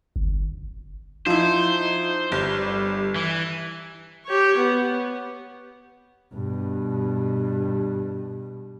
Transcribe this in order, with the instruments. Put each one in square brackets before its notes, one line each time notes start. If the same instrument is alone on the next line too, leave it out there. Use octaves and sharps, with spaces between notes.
[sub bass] G1
[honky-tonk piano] F3 E4 [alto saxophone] D#4 [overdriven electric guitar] C5
[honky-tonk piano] G1 [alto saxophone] G3
[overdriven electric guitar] E3
[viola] G4 C#5
B3
[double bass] G2 B2